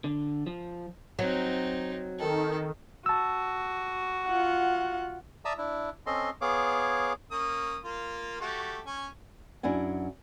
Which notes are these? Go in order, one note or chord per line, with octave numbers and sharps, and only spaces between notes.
D3
F3
F#3 C4 D#4
D#3 A4
F#4 A5 E6
F4 F#5
D5 E5 A5 A#5 D#6 E6
D4 E4
C4 C#4 A4 D#5 C6
B3 G#4 C#5 F5 D6
A#3 C#4 D#6
A#3 F4
A3 F#4 G4
C#4 G#5
F#2 D4 E4 F#5 G#5